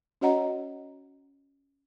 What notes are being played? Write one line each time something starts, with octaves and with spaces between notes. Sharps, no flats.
C#4 F#4 C#5 D#5 F#5 A#5